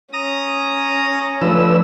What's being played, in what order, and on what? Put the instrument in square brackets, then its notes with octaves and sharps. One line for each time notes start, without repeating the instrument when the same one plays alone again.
[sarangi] C#4 [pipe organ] A#5 D#6 A#6
[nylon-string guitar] F3 A3 [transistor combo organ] D4 B4 E6